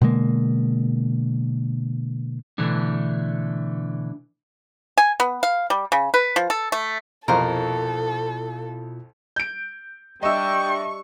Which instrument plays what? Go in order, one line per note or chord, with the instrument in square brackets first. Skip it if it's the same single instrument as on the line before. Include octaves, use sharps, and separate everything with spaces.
[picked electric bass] B2 D3 G#3 A#3
[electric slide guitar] B2 D3 E3 A3 D4
[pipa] G#5
B3
F5
G3
C#3
B4
F3
A4
A3
[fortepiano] C2 F2 C5 [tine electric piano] B2 E4 F4 [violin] A4 [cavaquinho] A#4
[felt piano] G6 D7
[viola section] G3 D4 [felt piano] D#5 E5 E6 [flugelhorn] G5 [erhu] C#6